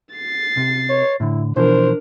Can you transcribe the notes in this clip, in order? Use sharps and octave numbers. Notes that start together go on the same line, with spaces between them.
A6 C7
C3
C#5
A2 D3 E4
B2 E3 F3 D4 A#4 C5